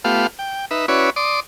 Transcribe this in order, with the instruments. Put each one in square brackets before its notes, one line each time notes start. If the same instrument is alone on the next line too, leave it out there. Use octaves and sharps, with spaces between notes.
[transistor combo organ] A3 B3 F4 G4 F5
G5
D#4 B4 E5
C#4 E4 F#4 B4 C#5 D5
D5 C6 D6 D#6